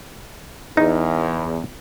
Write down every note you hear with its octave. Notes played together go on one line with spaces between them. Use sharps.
E2 D#4